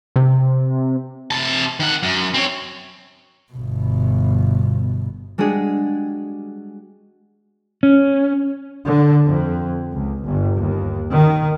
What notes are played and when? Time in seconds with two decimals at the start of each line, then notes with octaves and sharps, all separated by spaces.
0.16 C3
1.31 C3 A5
1.80 D#3 F#5
2.03 F#2
2.34 C4 C#5
3.52 G1 B2
5.38 G3 G#3 D4 F#4 G#4
7.83 C#4
8.87 D3
9.26 F2
9.92 C#2
10.24 G1
10.58 D#2
11.12 D#3